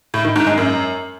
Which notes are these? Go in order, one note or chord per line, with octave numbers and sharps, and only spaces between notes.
A2
D#3
G#2
G#3
F#2